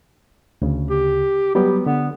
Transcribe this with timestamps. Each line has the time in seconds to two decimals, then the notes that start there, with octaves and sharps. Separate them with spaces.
0.62 D2 C#3
0.90 G4
1.55 F#3 G3 B3 G4
1.86 D3 B3